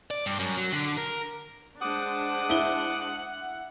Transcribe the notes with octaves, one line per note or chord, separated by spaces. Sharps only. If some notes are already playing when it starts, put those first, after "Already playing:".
D5
G2
F#2
F#3
D3
A#4
G#3 D4 C5 F#5 D6 D#6
E4 G7